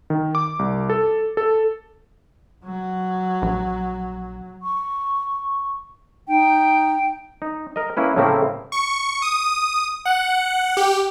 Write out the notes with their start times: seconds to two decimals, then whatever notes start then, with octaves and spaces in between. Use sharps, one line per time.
0.10 D#3
0.35 D6
0.59 C2
0.90 A4
1.37 A4
2.65 F#3
3.42 A#1
4.62 C#6
6.28 D#4 G5
7.42 D#4
7.76 A#4 D#5
7.97 A#3 C#4 E4 B4
8.16 A2 C#3 A3 A#3 C4 E4
8.72 C#6
9.22 D#6
10.05 F#5
10.77 G4